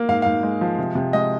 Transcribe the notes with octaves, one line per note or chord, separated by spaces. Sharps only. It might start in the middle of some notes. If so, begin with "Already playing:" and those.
Already playing: A#3
G#2 F5
G#2 F5
G#3
F3
C3
C3
G#3 D#5